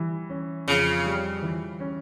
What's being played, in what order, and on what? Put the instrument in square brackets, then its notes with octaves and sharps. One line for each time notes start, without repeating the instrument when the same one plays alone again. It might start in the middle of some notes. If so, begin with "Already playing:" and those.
Already playing: [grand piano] E3 G3
C#4
[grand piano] F2 [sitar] C#3
[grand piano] G3
E3
C#4